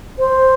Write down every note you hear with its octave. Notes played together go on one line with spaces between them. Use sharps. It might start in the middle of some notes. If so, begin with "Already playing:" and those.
C5